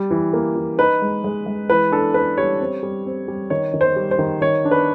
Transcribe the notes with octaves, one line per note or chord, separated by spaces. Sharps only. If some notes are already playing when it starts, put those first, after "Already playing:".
Already playing: G3
E3
A#3
E3
D#4 B4
G#3
G#3
G#3
E3 B4
D4 A4
D4 B4
G3 C#5
C4
G3
C4
G3
D#3 C#5
D#3
C5
G3
C5
D#3
D#3 C#5
D4
B4